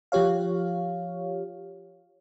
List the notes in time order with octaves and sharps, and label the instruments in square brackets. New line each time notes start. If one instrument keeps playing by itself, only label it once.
[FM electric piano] F3 F4 G4 C#5 F5